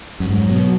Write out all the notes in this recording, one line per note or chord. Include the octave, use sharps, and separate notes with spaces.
F#2
G#2 F#3
B2